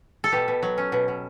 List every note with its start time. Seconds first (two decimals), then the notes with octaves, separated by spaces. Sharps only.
0.24 A4
0.32 B2 G4
0.48 B2
0.63 F#3
0.78 C#4
0.92 B2
1.08 B2